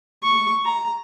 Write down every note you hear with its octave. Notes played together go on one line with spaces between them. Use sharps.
C#6
A#5